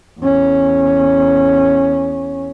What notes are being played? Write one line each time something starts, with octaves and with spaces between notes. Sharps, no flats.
E2 C#4